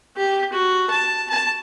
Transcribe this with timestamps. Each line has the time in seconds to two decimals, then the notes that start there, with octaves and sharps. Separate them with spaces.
0.16 G4
0.52 F#4
0.90 A5
1.30 A5